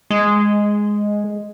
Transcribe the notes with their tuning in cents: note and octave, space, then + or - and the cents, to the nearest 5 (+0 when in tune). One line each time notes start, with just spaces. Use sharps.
G#3 +0